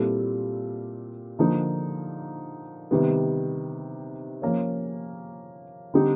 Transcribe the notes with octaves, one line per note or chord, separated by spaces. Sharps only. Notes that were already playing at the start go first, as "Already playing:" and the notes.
Already playing: A#2 G3 C4 E4 A4
D3 F3 A#3 D#4
C3 D#3 G3 B3
F3 A#3 C#4
D3 G3 C4 D#4 G4